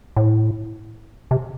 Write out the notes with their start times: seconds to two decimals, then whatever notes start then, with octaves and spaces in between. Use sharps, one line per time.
0.16 A2
1.31 C3